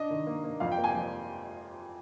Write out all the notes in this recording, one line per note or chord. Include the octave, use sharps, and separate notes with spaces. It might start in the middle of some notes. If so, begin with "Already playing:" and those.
Already playing: D4 D#5
D#3
A#3
A#3
F2 F5
G5
A#3
G#5
F3